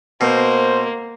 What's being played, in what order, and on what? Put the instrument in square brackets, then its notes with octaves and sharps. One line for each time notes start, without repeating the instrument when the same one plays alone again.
[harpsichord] B2 [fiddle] A#3 [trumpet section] C5